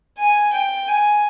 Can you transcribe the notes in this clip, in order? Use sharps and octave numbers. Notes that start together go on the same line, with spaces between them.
G#5
G5
G#5